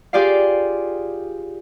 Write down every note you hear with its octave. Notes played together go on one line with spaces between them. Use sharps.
F4 G4 G#4 D5 F5